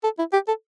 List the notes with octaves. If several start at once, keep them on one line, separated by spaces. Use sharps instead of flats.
A4
E4
G4
A4